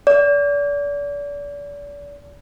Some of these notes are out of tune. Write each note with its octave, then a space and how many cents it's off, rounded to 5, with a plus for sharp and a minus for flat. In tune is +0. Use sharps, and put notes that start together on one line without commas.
D5 -35